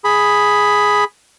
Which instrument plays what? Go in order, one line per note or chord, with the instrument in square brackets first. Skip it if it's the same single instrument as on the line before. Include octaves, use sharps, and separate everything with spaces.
[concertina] G#4 B5